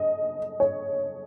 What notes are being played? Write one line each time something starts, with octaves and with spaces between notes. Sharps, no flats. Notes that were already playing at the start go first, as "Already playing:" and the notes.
Already playing: D#5
C#5